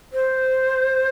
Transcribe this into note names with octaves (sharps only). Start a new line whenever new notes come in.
C5